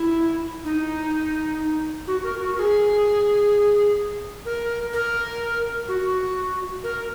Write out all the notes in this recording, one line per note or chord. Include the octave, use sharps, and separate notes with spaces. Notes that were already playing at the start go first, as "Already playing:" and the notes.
Already playing: E4
D#4
F#4
A#4
F#4
A#4
G#4
A#4
A#4
F#4
A#4